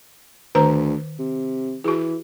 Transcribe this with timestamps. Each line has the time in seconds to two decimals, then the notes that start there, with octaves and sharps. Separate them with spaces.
0.55 D2 D#3 C5 A#5
1.19 C3
1.84 E3 F#4 G#4